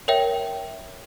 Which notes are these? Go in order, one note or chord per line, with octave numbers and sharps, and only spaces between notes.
A#4 C#5 E5 G5